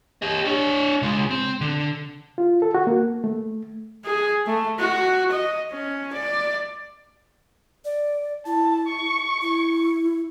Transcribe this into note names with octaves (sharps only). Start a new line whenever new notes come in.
G4 D#5
D4 C#5
C#3 G#3
C4
D3
F4
A4
F#4
A#3
A3
G#4
A3
F#4
D#5
C#4
D5
D5
E4 A5
C#6
E4